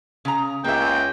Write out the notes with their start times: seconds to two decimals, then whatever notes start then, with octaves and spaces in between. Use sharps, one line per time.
0.25 C#3 A#5
0.64 C#2 A#3 E5 G5